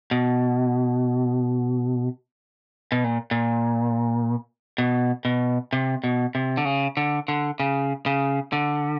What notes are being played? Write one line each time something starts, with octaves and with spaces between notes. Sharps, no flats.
B2
B2
A#2
A#2
B2
B2
C3
B2
C3
D3
C#3
D3
D3
C#3
C#3
D3